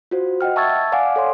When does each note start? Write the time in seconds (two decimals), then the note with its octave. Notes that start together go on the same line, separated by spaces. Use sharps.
0.11 F4 F#4 C5
0.41 D#5 F#5 G5 F6
0.56 E5 A5 C#6 E6 G#6 A6
0.92 D5 F5 F#5 G#5 D6
1.16 A4 C#5 C6